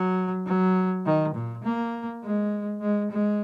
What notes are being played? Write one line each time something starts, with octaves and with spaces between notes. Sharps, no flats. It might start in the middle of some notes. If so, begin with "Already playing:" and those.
Already playing: F#3
F#3
D#3
A#2
A#3
G#3
G#3
G#3